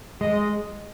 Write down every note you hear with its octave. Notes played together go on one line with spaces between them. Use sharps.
G#3 D#5